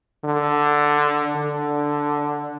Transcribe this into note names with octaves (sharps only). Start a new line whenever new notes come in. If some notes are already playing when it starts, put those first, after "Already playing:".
D3
D3